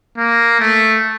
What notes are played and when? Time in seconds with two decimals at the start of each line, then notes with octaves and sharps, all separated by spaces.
0.18 A#3
0.60 A3